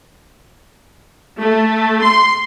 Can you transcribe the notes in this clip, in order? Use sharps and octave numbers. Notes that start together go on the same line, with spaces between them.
A3
C6